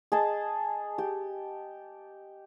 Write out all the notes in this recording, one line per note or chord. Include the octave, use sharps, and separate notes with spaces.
G#4 D#5 A5
G4